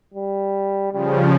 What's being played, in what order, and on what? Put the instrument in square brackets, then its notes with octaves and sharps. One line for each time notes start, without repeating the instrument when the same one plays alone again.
[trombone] G3
[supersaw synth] C#3 F3 [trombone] G3